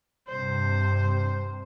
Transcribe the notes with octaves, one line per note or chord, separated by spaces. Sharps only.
G2 C3 C5